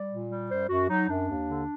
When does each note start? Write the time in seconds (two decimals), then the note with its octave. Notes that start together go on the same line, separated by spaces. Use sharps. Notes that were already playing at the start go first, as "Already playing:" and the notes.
Already playing: G3 D5
0.10 A#2
0.30 G3
0.50 F#2 C5
0.69 F#2 F#4
0.89 F#3 D#4
1.09 F#2 D4
1.28 D#2
1.49 D3